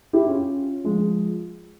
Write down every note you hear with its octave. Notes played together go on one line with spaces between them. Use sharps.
E4 G4
C#4 F4
F3 G#3